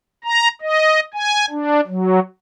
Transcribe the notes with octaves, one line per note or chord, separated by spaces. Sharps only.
A#5
D#5
G#5
D4
F#3